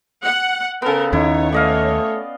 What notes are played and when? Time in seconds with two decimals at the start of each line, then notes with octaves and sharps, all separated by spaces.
0.24 F#5
0.82 C#3 B3 A4 A#4
1.13 D#2 D#3 C#4 D#4 E4 C#5
1.52 A3 D5 D#5 F5